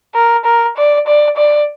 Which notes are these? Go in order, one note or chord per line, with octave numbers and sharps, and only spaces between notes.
A#4
A#4
D5
D5
D5